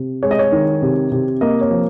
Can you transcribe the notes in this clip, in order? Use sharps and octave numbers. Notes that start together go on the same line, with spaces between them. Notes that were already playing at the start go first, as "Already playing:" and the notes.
Already playing: C3
G#3 C#5
D#5
C#5
D#3
C3
C3
A#3 D#5
C#5
F3